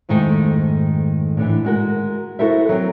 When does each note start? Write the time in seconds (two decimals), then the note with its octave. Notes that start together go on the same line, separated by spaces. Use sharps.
0.09 F2 G#2 D#3 A3
1.37 A2 D3 E3
1.65 G#3 F#4 A#4
2.39 E4 F#4 A4 A#4 C5 E5
2.69 F#3 C4